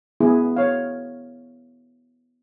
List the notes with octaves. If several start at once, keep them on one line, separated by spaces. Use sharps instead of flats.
B3 E4 G#4
C#5 F5